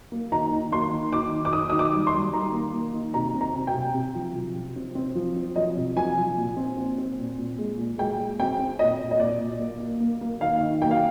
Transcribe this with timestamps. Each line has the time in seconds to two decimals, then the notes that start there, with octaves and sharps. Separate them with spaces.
0.12 A#3
0.32 D#3 A#5
0.51 D#3
0.72 A#3 C6
0.92 D#3
1.12 D#3 D6
1.32 D#3
1.45 D6
1.53 D#3 D#6
1.70 D#3 D#6
1.79 D6
1.92 G3
2.07 C6
2.14 G3
2.33 D#3 A#5
2.53 A#3
2.74 A#3
2.93 D#3
3.14 C3 A#5
3.34 C4
3.41 A#5
3.55 C4
3.67 G5
3.74 C3
3.95 C3
4.15 F3
4.35 F3
4.55 C3
4.76 C4
4.95 C4
5.15 F3
5.36 C4
5.56 F3 D#5
5.77 C3
5.96 F3 G#5
6.17 F3
6.37 A#2
6.57 C4
6.77 C4
6.98 C4
7.18 A#2
7.38 A#2
7.58 G#3
7.78 A#2
7.98 G#3 G5
8.19 G#3
8.39 C4 G5
8.59 C4
8.79 A#2 D#5
9.00 A#2
9.11 D#5
9.19 A#2 D5
9.40 A#2
9.59 A#3
9.80 A#3
10.00 A#3
10.21 A#3
10.41 D#3 F5
10.61 D#3
10.82 A#3 G5
10.91 F5